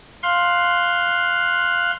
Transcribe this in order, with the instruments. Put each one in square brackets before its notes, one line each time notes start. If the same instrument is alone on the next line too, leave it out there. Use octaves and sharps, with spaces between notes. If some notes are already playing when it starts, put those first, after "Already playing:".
[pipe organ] F5 C6 F#6